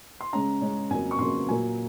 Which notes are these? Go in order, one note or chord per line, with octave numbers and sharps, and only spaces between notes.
C6
C#3 G#3 C#4 A#5
C#3 G#3 C#4
F2 C#3 F#3 A#3 G#5
C#6
F2 C#3 F#3 A#3 C6
A#2 F#3 A#3 G#5